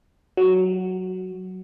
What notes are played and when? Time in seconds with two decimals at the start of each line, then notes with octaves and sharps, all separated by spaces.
0.37 F#3